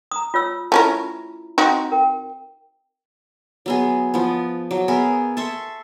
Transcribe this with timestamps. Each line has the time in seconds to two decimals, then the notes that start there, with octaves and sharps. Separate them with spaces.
0.11 A#5 D#6
0.34 F4 C#5 E6
0.72 A3 C#4 E4 F4 A#4 A#5
1.58 C4 D#4 F#4
1.92 A#4 G5
3.66 F#3 B3 G#4
4.14 F3 B3
4.71 F#3
4.88 B3 G#4 A#4 E5
5.37 A4 E5 C6 C#6